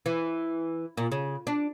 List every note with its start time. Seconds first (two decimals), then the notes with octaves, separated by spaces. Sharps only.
0.06 E3
0.97 A#2
1.12 C#3
1.47 D4